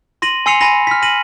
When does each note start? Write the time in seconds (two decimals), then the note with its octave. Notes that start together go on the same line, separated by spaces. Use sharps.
0.22 C6 A#6 D#7 F#7
0.46 G#5 C6 E6 C7 C#7 F7
0.61 G#5 B5 C6 A#6 F7
0.87 F6 B6
1.02 A#6 D#7 F#7